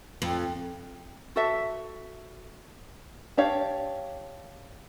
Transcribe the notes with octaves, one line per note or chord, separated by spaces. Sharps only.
F2
F#4 A4 E5
D4 G4 C#5 F5